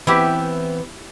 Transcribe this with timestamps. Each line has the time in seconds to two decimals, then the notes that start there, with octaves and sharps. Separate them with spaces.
0.07 E3 B3 C4 E4 G4